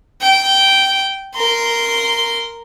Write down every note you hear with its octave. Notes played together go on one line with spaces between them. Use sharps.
G5
A#4 C6